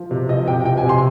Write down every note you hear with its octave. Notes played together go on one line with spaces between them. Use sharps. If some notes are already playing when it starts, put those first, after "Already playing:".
Already playing: F3
C3
F3 D#5
C3 G5
F3 G5
G#5
C3
C6